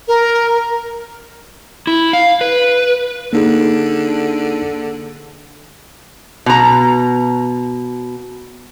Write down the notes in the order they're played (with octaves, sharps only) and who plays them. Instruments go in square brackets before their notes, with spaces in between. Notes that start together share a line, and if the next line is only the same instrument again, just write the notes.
[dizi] A#4
[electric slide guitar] E4
F5
B4
[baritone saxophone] D3 [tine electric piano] A#3 D#4 G#4
[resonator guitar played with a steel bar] B2 A#5